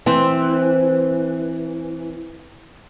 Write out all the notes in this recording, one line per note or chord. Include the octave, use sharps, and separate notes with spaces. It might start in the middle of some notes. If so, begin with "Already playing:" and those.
E3 C4